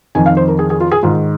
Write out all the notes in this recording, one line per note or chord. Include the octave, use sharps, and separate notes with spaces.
F2 D#3 G#5
F5
C5
A#4
G#4
G#4
F4
G#4
G#2 D#3 F4